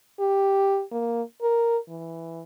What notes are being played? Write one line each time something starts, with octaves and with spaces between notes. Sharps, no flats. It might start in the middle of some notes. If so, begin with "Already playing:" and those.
G4
A#3
A#4
E3